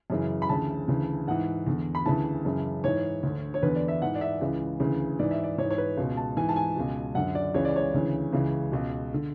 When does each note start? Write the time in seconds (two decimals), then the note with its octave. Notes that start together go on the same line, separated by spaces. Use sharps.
0.10 F#2 C#3 E3
0.42 B5
0.49 D2 C#3 E3 A5
0.88 D2 C#3 E3
1.27 G#2 E3 F#5
1.67 E2 D3
1.95 B5
2.06 D2 C#3 E3 A5
2.45 F#2 C#3 E3
2.84 G#2 E3 C#5
3.23 D2 D3
3.54 C#5
3.63 E2 D3 B4
3.76 D5
3.88 E5
4.02 G#2 E3 F#5
4.15 D5
4.21 E5
4.41 C#2 C#3 E3
4.80 D2 C#3 E3
5.19 G#2 E3 D5
5.31 E5
5.44 D5
5.58 E3 C#5
5.63 G#2
5.71 C#5
5.78 B4
5.97 C#2 B2
6.17 A5
6.37 G#2 E3 G#5
6.49 A5
6.56 G#5
6.76 C#2 B2
7.15 F#2 D3 F#5
7.35 D5
7.54 C#2 C#3 E3 C#5
7.65 D5
7.76 C#5
7.94 D2 C#3 E3
8.33 C#2 C#3 E3
8.72 C#2 B2
9.14 D3